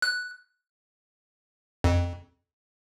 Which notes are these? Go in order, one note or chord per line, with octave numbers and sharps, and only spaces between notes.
F#6
F2